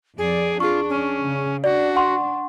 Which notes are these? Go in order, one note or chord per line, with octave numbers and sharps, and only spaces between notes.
F2 G#4 D5
D4 F4 G#4 C#6
C#4
C#3
D4 F#4 D5
F#5 C6 C#6